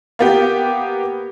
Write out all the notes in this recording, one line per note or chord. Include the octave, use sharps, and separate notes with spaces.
A#3 B3 G4